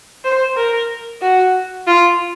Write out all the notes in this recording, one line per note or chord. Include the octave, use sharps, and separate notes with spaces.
C5
A#4
F#4
F4